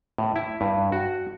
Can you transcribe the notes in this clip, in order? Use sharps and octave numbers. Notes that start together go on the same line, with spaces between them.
A2
E4
G2
F#4